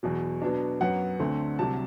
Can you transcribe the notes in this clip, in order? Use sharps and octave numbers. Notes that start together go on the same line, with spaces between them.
E2 B2 F#3
B2 F#3 B3 D4
F#2 F#3 B3 F#5
D2 D3 A3 C4
C2 C3 F#3 A5